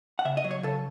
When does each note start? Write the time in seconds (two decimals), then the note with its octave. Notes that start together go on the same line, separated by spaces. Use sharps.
0.19 F#5
0.25 C#3 E5
0.37 D#5
0.44 F#3
0.51 C#5
0.63 C#3 A4